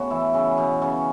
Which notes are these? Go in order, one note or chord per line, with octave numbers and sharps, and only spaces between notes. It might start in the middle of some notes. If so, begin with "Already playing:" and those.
Already playing: C#3 A3 B3 C#4 F#4
E3 E4
C#3 C#4
B2 B3
C#3 C#4